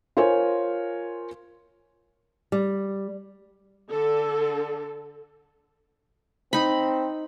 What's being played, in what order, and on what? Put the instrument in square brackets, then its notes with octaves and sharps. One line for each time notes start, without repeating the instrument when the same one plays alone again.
[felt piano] F4 A#4 C5 C#5 G#5
[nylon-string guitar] G3
[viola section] D3 A4
[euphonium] C4 [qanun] D#4 B5